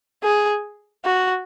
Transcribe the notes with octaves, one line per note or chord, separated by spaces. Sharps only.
G#4
F#4